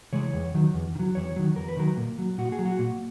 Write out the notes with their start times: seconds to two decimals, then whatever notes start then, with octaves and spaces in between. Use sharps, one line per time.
0.13 C#3 E3 G#3 C#5
0.33 E2
0.54 D#3 F#3
0.74 E2
0.95 D#3
0.99 F#3
1.15 E2 C#5
1.36 D#3 F#3
1.56 E2 A#4
1.68 B4
1.77 D#3 F#3 A#4
1.97 A#2
2.18 F#3
2.38 A#2 F#4
2.52 G#4
2.59 F#3
2.65 F#4
2.79 A#2